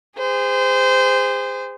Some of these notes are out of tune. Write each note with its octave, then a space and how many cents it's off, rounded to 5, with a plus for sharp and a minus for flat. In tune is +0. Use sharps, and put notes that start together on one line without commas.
G#4 -35 C5 -25